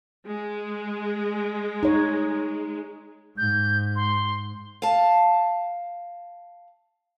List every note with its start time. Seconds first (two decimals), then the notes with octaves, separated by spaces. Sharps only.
0.26 G#3
1.83 D#4 C#5
3.38 G#2 G6
3.96 C6
4.82 F5 A5